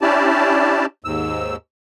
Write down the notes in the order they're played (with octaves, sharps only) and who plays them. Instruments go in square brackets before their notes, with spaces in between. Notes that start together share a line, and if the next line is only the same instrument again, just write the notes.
[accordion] C#4 D4 E4 G4 D5 A5
D#2 G#2 E6